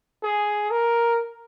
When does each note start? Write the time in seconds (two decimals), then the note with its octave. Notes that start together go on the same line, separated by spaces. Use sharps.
0.23 G#4
0.71 A#4